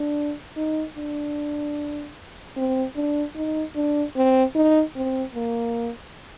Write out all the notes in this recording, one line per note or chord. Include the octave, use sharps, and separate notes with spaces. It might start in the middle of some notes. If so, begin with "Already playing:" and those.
Already playing: D4
D#4
D4
C4
D4
D#4
D4
C4
D#4
C4
A#3